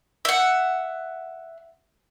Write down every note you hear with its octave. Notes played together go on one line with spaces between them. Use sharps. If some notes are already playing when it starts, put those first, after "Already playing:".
E5 F#5